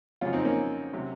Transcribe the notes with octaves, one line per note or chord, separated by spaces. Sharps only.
F2 C#3 F#3 C#4 F4
C4 D#4
A#3 C#4
C3 F#3